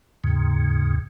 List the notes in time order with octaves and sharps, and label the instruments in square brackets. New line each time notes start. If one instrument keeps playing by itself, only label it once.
[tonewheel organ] D#2 G#2 C#3